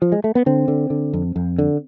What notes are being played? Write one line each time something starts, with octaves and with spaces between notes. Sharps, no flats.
F3
G#3
A3
B3
D3 C4
D3
D3
F2
F2
D3